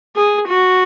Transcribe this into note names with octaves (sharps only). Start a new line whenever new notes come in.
G#4
F#4